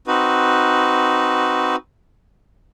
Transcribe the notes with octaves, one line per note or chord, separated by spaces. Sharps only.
C4 D#4 F#4 B4